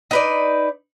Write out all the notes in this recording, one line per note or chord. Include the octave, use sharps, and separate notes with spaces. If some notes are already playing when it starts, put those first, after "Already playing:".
D#4 B4 D5